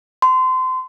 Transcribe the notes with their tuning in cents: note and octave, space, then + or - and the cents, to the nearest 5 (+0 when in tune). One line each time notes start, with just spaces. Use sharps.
C6 -25